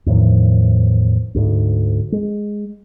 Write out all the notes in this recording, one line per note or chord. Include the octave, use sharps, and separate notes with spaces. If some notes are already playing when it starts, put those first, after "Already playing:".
E2 A2 D#3 F3
D2 G#2
G#3